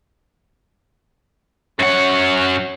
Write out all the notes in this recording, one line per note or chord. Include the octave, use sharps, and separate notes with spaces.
F#2 C#5 F#5